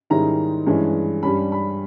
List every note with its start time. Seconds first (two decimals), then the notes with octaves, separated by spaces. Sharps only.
0.10 G#2 D#3 G3 C#4 E4 A#5
0.67 G2 E3 G#3 C#4
1.23 G2 G3 C#4 B5
1.52 B5